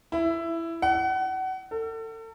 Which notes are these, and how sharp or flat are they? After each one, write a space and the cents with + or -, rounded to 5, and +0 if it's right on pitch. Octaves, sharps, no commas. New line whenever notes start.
E4 +10
F#5 +30
A4 +35